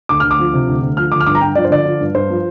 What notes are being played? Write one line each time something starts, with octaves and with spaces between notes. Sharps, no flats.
D2 D6
D2 F6
D6
F3
C3
D2
D2
F3 F6
D3 D6
F6
G2 D6
A#5
G2 G5
F3 D5
C5
D3 D5
F3
G2
G2 C5
F3